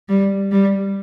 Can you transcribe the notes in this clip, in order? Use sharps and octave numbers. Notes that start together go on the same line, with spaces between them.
G3
G3